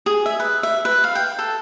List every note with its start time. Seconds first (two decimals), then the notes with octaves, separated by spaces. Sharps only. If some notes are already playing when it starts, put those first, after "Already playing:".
0.06 G#4
0.26 E5
0.40 B4
0.63 E5
0.85 B4
1.04 F5
1.15 G5
1.39 A4